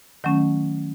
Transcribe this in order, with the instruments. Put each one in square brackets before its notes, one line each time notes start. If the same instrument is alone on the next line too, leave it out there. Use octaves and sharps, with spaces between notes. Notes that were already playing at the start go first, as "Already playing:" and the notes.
[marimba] D#3 F#3 A3 C#4